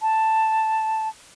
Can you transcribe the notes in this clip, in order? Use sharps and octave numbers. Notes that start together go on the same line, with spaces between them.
A5